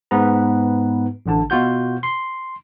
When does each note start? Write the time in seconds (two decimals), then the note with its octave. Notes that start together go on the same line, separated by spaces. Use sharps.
0.11 G#2 B3 B4 A#5
1.26 A1 D3 A5
1.50 B2 F4 F#4 G6
2.03 C6